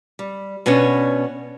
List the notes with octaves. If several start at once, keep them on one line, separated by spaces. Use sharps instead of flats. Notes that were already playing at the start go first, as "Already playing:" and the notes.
G3
B2 B3 C#4 D4 C#5